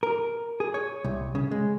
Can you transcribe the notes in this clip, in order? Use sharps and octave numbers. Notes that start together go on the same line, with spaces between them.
A#4
G#4
C#5
C2
C#3
G#3